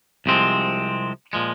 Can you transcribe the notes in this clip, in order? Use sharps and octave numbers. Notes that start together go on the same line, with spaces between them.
C2 C3 F3 G#3 C4
A#2 F3 G#3